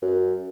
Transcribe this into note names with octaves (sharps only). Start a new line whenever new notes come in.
F#2